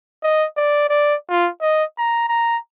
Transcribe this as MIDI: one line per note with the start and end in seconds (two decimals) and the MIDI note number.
0.23 0.46 75
0.57 0.87 74
0.89 1.15 74
1.30 1.49 65
1.61 1.84 75
1.98 2.25 82
2.28 2.58 82